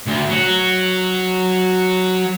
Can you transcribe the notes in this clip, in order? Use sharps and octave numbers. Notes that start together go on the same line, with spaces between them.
D2
F#3 F#4